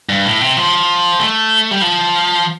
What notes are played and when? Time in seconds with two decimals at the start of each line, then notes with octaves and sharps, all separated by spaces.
0.09 G2
0.25 A2
0.41 C3
0.57 F3
1.20 A3
1.71 G3
1.82 F3